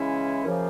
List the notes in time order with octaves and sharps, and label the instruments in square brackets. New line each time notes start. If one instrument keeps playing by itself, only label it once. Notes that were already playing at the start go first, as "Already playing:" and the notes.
Already playing: [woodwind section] C#3 E3 G#3 C#4 E4
F#2 C#3 F3 A#3